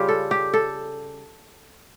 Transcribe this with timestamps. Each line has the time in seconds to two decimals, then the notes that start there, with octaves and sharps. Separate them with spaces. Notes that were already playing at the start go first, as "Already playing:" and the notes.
Already playing: C#3 G3 F4 G4
0.08 A4
0.31 G4
0.53 A4